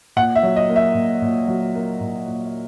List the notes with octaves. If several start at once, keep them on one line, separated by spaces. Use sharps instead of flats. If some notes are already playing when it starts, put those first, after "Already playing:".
A#2 F#5
E5
F#3
D#5
A#3
E5
A#2
A#2
F#3
A#3
A#2
A#2